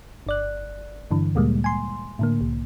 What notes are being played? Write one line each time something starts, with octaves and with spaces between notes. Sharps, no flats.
G1 D5 F#6
G2 D3 E3
D2 A#2 G3 G#3 A#3
G#5 C6
A2 D3 A#3
C2